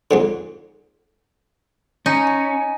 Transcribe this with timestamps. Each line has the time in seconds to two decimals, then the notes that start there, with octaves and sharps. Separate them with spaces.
0.11 F2 G#2 D3
2.06 C#4 D#4 G#5